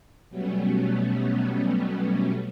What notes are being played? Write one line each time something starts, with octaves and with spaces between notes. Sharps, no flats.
B2 F#3 G3 A3 B3 C#4